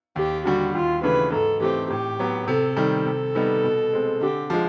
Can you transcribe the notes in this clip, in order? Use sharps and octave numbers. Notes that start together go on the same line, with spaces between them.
D#2 G4
D3 G3 F#4
D#2 F4
C#3 E3 A3 D4 B4
G#2 A4
E3 A3 C4 G4
A2 G4
F#3 B3
C3 A4
D#3 G3 A4
C3
D#3 G3 B3 D#4
B2
G#3 C4
D3 G4
F3 G#3